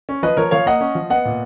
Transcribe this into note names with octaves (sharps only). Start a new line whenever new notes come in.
C#4
F3 B4 D#5
F3 A#4 C#5
F3 C#5 F5
A#3 D#5 F#5
C#4
F3
B3 D#5 F#5
A#2